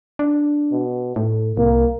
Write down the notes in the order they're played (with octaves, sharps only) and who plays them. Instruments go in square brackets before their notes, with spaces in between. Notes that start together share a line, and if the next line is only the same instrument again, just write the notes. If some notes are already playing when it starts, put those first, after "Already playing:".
[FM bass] D4
[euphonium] B2
[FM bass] A2 [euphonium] A4
[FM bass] C2 [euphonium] A#3